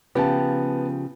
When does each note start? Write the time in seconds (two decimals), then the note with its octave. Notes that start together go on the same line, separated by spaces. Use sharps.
0.15 C#3 F3 B3 G4 G5 A5